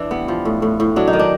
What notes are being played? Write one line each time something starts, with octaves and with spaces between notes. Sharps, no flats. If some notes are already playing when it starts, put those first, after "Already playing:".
Already playing: E3 D4
G3 B3
F3
A2
A2
A2
F#3 D4
D#4
D#3
D4